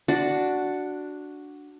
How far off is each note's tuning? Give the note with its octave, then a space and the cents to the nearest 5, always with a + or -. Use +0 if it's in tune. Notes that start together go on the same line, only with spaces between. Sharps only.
D4 +0 F#4 +0